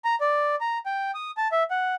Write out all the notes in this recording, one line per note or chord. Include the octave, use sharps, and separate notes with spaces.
A#5
D5
A#5
G5
D#6
A5
E5
F#5